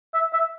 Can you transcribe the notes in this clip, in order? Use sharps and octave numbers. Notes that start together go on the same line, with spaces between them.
E5
E5